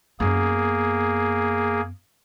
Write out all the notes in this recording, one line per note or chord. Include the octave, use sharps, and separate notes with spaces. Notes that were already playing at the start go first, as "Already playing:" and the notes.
F#2 A#3 B3 G#4